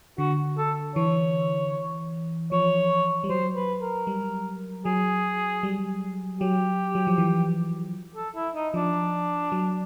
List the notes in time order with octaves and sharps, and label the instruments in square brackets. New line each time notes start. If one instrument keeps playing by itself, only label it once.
[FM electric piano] D3 [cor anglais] F#4
[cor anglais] A4
[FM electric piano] E3 [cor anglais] C#5
[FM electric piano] F3 [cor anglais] C#5
[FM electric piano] G3
[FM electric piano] F#3 [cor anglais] C5
[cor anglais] B4
A#4
[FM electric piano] G3
[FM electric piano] F#3 [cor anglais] G#4
[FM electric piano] G3
[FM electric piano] F#3 [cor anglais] G4
[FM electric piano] F#3
F3
E3
[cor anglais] A4
E4
D#4
[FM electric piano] F3 [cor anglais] D4
[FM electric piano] F#3